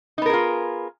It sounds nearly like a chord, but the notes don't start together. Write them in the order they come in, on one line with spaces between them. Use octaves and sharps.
D#4 B3 A#4 G#4 F4